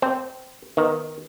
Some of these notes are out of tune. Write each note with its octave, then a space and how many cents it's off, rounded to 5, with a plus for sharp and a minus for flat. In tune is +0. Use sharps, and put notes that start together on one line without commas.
C4 -15 C5 -15
D#3 +0 B3 +0 D#4 +0